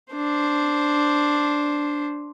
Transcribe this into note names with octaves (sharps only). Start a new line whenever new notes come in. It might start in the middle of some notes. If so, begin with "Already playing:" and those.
D4 C5